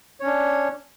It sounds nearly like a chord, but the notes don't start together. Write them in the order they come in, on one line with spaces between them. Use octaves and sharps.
C#5 C#4 D4